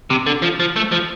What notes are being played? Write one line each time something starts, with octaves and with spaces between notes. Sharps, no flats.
C3
D3
F3
F3
A3
F3